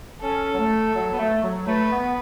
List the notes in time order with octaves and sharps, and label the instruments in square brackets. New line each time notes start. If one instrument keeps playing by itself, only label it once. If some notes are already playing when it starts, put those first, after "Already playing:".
[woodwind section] C#4 [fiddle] A4
[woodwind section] F#3
A3
F#3
B3
A3
F#3
[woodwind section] A3 [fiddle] B4
[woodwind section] B3